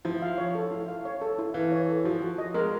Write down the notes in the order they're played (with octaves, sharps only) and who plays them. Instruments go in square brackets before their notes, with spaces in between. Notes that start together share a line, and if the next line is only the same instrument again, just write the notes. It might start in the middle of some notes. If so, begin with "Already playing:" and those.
[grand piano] F3 [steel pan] E4
[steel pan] F5
C#5
A4
E4
F5
C#5
A4
E4
[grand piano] E3 [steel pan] F5
[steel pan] C#5
A4
[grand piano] F3 [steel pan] F#4
[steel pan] F#4
D#5
[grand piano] G#3 [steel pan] A#4